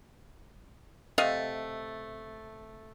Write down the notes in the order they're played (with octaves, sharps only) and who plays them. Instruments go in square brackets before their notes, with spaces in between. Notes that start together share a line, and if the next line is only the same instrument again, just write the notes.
[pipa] C3 A3 D#5 F5